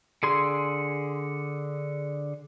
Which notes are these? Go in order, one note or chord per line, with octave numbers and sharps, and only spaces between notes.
D3 G#4 C6